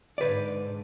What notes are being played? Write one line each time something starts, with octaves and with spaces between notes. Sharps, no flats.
G#2 D3 B4 D5